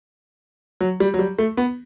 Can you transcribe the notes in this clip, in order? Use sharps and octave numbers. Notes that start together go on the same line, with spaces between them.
F#3
G3
F#3
G3
A3
B3